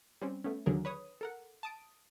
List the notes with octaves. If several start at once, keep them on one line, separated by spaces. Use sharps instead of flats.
G3 C4 C#4
A3 B3 C#4
D#2 D3 F#3 G#4 A#4
B4 C#5 D#6
A4 A#4 F#5
A5 D#6 D7